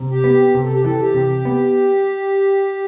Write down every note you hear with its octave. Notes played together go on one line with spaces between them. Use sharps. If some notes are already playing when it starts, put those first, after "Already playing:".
Already playing: C3
G4
B3
C3
A4
G4
E3 A4
G4
C3
B3